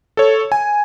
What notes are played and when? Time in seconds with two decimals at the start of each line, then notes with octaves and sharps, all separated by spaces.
0.17 A4 C#5
0.52 G#5